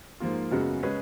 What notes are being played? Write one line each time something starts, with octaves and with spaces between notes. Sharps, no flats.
G#2 F3 A#3 F4
F#2 C#3 G#3 B3 F#4
C#3 G#3 C#4 G#4 B4